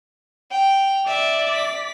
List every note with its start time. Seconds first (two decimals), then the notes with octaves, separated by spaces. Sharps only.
0.51 G5 F7
1.07 D5 E5
1.53 B6